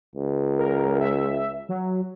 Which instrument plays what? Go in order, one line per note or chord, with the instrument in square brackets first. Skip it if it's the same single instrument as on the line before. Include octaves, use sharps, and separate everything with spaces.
[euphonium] C#2
[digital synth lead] A#4
E5
F#3